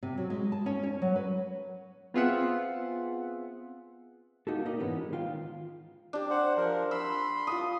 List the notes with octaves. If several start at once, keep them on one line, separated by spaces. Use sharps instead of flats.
C3
F#3
G#3
A5
C#4
C#5
F#3
B4
B3 C4 F4 G#4 E5 F#5
A#3 D#4 F#4 G4 A4
D#4 G4 A#4 D5 D#5
G#2 E3 B3 C#4
G#3
D#3 F4 F5 G5
D4 G4
C5 F#5
F3 A#4
B5 C6 E6
F4 F#5 D#6